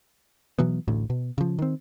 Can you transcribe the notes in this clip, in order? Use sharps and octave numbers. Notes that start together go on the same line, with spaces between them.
B2 E3 F#3 B3
A1 D2 A2
B2
C#3 F3
D#3 C4